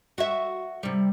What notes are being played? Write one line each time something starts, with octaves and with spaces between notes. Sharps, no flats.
F#4 E5
C3 G3